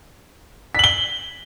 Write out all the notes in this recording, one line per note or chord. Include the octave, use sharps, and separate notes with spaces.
B6 F#7 G7